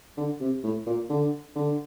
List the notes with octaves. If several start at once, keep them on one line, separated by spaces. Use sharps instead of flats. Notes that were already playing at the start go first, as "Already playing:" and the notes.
D3
C3
A2
A#2
D3
D3